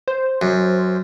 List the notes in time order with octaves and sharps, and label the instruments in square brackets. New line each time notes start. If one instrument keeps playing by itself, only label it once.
[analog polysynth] C5
[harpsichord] F#2